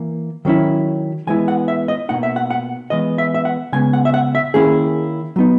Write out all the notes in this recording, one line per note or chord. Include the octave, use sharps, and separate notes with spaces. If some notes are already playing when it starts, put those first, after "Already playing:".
Already playing: E3 A#3
D#3 F#3 C#4 E4
E3 G#3 B3 E4 G#5
F#5
E5
D#5
B2 A#3 D#4 F#5
E5
F#5
F#5
E3 G#3 B3 D#5
E5
E5
F#5
C#3 G#3 B3 G#5
F#5
E5
F#5
E5
D#3 A#3 C#4 E4 G#4
F#3 B3 D#4